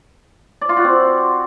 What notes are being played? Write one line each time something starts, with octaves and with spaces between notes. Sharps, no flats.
D5
F4
F#4
C4